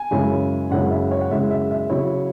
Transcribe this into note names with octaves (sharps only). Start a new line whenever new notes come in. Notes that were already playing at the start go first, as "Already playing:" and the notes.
Already playing: G#5
F#2 C#3 G#3 C#4 E4
F#2 C#3 G#3 C#4 E4 F#5
E5
C#5
F#5
F#2 C#3 G#3 C#4 E4 E5
E5
E5
C#3 F#3 E4 C#5